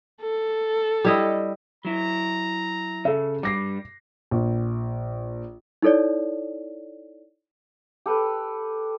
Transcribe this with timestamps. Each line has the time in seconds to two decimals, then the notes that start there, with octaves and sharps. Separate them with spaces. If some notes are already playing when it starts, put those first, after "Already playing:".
0.22 A4
1.05 G3 E4 D#5
1.85 F#3 E4 A#5
3.05 C#3 A4 E5
3.43 G2 G3 D6 A#6 C7
4.31 A#1
5.82 D#4 E4 A4 C#5 D5
8.06 G4 A4 B4